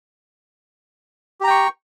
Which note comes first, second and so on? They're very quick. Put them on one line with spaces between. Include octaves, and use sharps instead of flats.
G4 A#5 G5 C#6